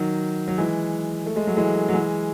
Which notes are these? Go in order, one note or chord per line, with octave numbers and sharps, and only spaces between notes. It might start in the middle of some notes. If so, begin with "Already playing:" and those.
Already playing: D#3 F#3
F#3
E3 G#3
A3
G#3
F#3
E3 G#3
F#3
E3 G#3